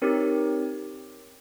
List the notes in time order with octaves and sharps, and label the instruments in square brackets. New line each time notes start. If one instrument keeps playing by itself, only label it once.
[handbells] C4 D#4 G4 A#4 C#5